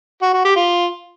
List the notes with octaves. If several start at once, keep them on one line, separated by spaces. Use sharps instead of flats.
F#4
F#4
G4
F4